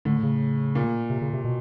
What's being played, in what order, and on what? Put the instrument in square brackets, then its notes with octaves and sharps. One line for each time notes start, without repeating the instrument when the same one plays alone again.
[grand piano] A2 [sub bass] D3
[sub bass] C#3
[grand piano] A#2
[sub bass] C3
C#3
C3
B2